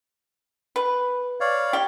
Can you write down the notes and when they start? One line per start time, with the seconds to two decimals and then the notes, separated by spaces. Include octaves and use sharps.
0.76 B4
1.41 C#5 D5 F5
1.73 G4